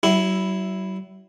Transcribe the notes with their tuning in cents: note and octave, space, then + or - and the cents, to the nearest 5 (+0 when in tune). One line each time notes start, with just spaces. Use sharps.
F#3 +40 E4 +0